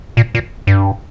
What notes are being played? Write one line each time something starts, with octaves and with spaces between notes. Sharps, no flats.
A#2
A#2
G2